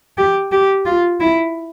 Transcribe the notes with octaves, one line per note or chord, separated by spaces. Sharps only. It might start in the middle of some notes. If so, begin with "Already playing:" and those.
G4
G4
F4
E4